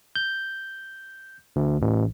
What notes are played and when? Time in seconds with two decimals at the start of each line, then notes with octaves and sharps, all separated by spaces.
0.16 G6
1.56 D2
1.82 A1